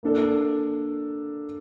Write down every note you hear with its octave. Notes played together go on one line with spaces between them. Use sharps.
A#3 D4 A4